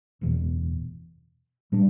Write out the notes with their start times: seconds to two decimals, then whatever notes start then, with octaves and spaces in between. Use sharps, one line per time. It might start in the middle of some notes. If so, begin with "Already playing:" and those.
0.21 F#1 E2 B2
1.72 A2 G3 D4